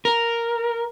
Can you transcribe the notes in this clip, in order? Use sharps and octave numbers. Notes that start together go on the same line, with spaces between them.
A#4